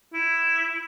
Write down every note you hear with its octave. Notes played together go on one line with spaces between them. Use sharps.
E4